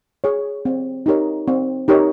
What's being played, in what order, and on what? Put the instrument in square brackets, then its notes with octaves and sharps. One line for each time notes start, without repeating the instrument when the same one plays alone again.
[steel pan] G#4 C#5
C4
D#4 G4 A#4 C#5
C4
D#4 G4 A#4 C#5